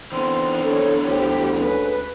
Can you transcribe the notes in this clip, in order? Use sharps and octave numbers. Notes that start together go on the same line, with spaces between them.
E2 D3 C4 C6
D4 A4 C#5
D2 G4 C5
G#3 C#4 B4